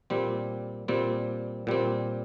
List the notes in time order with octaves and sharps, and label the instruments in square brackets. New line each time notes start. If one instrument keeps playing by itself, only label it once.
[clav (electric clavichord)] A#2 G3 C4
A#2 G3 C4
A#2 G3 C4